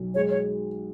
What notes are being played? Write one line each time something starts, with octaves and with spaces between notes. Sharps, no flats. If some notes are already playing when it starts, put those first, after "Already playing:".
Already playing: B1
G#3 C#5
C#5